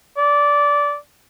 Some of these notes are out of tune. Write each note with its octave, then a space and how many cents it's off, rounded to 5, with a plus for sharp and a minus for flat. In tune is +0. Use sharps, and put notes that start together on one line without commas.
D5 -15